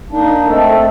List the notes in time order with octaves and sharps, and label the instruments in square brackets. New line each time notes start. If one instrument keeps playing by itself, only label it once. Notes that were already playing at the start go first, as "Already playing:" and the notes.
[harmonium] A#3 D4 [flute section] D#4
[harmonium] A3 C4 [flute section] A4 D#5